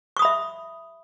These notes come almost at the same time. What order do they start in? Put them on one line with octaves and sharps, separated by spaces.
C#6 D#6 B5 E5